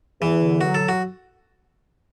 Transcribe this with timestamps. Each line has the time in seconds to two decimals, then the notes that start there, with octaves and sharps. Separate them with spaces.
0.21 E2 E3
0.41 D3
0.61 F#3 F#4
0.75 A4
0.89 F#4